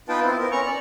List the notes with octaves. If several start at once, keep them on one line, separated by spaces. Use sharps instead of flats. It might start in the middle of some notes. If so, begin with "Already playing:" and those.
B3 D#4 F4 B4 G5 A5
C4 E4
B3 A#4
C#4 A#5 C#6
D5